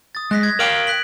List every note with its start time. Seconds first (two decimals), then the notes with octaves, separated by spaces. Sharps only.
0.15 D#6 A6
0.31 G#3 F#6 A#6 B6
0.43 G#6
0.59 A#4 F5 G5 B6 D7 F#7
0.87 F#6 B6 F#7